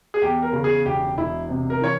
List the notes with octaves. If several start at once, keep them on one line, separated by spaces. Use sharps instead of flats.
G#4
E2 G4
A#4
C#3
G#4
E1 G4
E1 E4
C3
A#4
E3 C#5